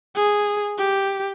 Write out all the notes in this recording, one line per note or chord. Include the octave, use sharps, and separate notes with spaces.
G#4
G4